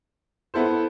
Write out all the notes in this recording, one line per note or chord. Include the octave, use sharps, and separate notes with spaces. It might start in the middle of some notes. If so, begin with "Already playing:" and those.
B3 E4 A4 C5